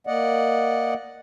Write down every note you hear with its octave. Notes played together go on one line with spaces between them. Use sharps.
A#3 D5 D#5 F#5